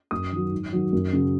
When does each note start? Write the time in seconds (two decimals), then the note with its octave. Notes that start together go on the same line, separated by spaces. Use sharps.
0.11 F#2 D#6
0.32 D#3 F#3
0.51 G#2
0.73 D#3 F#3
0.92 F#2
1.13 C#3 F#3